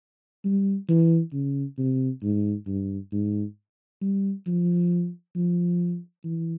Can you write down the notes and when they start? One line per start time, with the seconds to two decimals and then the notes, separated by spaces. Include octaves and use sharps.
0.45 G3
0.89 E3
1.33 C#3
1.78 C3
2.23 G#2
2.67 G2
3.12 G#2
4.02 G3
4.47 F3
5.35 F3
6.24 E3